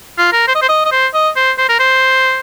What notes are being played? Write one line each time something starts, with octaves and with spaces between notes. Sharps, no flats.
F4
A#4
C5
D#5
C5
D#5
D#5
C5
D#5
C5
C5
A#4
C5